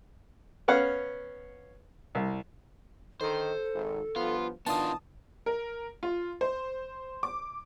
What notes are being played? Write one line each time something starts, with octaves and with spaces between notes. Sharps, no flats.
B3 C#4 F5 F#5
C2
D3 D#3 A4 C5
G#1
G2 F3 B3 F4
D#3 E3 B3 D4 F4 A5 D#6
A#4
F4
C5
D6